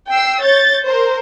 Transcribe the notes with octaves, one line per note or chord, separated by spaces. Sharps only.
G5 E6 C7
C#5 G6 A6
A#4 C5